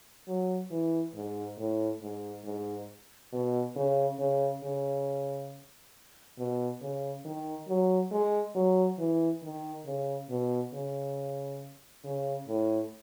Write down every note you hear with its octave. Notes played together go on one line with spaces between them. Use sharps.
F#3
E3
G#2
A2
G#2
G#2
B2
C#3
C#3
C#3
B2
C#3
D#3
F#3
G#3
F#3
E3
D#3
C#3
B2
C#3
C#3
A2